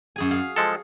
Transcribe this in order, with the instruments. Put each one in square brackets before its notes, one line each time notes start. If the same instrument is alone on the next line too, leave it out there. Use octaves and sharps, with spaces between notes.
[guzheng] F#2 G#4 G#5
G#4 F5
[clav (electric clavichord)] F3 G#3 A4